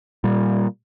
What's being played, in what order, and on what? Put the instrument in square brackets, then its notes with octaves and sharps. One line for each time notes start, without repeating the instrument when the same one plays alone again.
[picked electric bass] A#2 G3